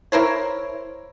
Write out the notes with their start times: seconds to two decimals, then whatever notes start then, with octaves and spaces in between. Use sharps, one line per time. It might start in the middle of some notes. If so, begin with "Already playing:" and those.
0.12 E4 A#4 C5 C#5